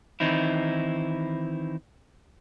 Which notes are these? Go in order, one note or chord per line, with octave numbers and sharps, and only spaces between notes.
D#3 E3 C4 D#4 E4